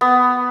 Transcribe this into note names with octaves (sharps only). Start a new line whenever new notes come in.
B3